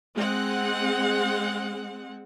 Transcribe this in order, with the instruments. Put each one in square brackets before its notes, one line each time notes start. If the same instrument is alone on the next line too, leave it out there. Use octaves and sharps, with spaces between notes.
[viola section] G#3 C4 F#5